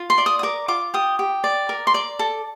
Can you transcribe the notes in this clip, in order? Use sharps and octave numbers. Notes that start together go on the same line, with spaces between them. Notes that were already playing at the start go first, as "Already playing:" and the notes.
Already playing: F4
C6
D5
D#6
D#6
A#4 D6
F4 D6
G4 D#6
G4
D5
A#4
C6
D5 D6
A4